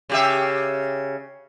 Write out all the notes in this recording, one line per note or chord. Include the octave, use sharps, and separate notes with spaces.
C#3 G4 E5